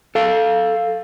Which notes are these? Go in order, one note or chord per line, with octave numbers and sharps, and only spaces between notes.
A4 F5